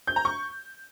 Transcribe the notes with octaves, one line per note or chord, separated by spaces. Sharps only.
G6
A#5
C#6